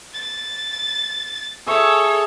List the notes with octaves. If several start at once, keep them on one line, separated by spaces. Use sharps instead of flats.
A6
G#4 A4 C#5 E5 C#6